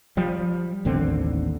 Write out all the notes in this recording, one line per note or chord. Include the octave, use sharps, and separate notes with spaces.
F3 G3
A1 D#2 D3 C4